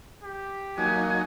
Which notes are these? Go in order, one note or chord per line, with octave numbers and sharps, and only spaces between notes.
G4
F#3 A#3 D#4 G#5